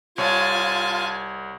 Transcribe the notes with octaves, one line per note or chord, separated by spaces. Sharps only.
C2 F4 C#5 G#5 A5